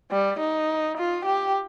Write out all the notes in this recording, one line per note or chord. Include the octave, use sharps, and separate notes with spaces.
G3
D#4
F4
G4